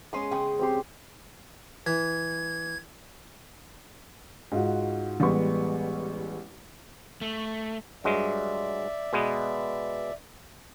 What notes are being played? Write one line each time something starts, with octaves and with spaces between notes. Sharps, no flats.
G#3 B3 C#4 C6 D#6
C#3 G5 B5 D#6
C4 G4 C6
E3 G#6
G#2 F4 F#4
A1 G3 G#3 B3 C#6
A3
G2 F#3 G#3 D5 E5
B2 G#3 B3